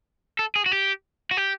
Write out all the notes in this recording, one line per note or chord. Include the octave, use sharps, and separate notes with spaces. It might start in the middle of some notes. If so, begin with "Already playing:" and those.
A4
G#4
F#4
G4
F#4
G4